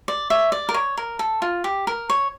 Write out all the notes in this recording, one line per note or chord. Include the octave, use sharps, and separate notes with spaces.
D5
C#5 E5
D5
A#4
C#5
A#4
A4
F4
G4
A#4
C#5